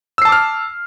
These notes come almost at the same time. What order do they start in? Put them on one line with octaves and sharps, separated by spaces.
E6 C7 A5 D6 F6